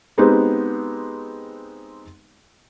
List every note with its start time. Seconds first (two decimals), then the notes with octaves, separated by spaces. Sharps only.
0.18 G#3 B3 C4 D#4 G4